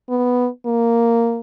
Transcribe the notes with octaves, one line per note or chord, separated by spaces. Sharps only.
B3
A#3